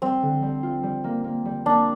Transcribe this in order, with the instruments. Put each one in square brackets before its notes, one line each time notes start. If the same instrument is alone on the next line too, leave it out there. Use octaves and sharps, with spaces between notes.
[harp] G3 [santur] C4
[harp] D3
G3
F4
G3
A#3
A#3
G3
[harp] A#3 [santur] D4